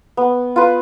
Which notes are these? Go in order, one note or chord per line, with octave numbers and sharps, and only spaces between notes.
B3
F4 B4